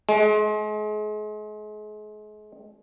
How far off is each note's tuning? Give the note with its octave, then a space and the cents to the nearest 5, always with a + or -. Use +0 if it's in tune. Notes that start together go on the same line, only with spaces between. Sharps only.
G#3 +35